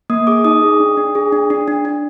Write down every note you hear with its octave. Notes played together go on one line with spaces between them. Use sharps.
A#3 D#6
G#4 D6
D#4 D#6
G#4
D4
D4
G#4
D4
D4
D4
D4